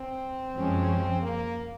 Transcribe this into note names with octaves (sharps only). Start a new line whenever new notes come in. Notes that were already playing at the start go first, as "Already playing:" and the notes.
Already playing: C4
F#2 F3 G#3 C#4
A#3